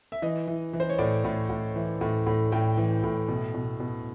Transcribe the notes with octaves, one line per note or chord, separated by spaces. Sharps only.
E5
E3 D#5
E3
E3
C5
C#5
A2 D5
A2
A2
E3
A2
A2
A2 G5
E3
A2
B2
B2
B2